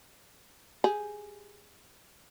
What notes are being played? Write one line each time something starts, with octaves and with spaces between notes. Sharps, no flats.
G4 G#4